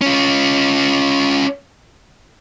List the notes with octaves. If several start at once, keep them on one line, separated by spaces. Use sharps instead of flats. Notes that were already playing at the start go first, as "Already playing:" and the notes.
C#4 F4